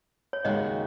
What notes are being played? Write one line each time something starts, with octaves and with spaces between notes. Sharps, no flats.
C#5
D#2 C#3 G#3 F#4 D#5